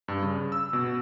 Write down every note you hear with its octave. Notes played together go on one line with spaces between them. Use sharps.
G2
C#3
E6
B2